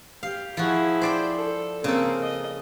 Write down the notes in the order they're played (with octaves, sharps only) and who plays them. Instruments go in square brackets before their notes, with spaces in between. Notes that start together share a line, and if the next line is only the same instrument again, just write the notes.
[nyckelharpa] G4 [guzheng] F5
[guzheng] F3 F#4 [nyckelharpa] E4 G#4
[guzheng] C5 D5 G5
[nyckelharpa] A4
[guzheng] C#3 A4 [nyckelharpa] A#3 C4
[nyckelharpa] D#5